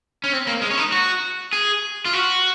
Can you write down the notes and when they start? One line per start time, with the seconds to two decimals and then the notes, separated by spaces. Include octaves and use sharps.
0.24 C#4
0.33 C4
0.47 A#3
0.62 G#3
0.70 C#4
0.78 D#4
0.92 F#4
1.53 G#4
2.05 F4
2.13 F#4